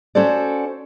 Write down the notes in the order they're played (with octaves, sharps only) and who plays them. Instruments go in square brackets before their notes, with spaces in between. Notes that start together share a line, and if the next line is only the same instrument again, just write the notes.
[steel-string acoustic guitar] C#4 F#4 A4 C5 D5